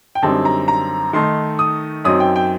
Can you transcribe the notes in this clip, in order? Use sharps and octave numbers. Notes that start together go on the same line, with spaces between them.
G5
F#2 D3 G3 C4 D#4 A5
A#5
A#5
D#3 A3 D#4 C6
D#6
F#2 F#3 C4 D#4 D#6
G5
G5